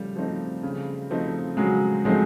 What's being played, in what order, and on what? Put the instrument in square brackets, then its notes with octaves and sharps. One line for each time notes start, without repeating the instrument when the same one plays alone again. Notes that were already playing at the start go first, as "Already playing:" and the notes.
Already playing: [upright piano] C#3 F3 A3 [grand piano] G3
[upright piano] F3 A3 C4 D#4
C#3
F3 A3 C4 D#4
[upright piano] C#3 [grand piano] F#3 G#3
[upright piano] F3 A3 C4 D#4 [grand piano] F#3 G#3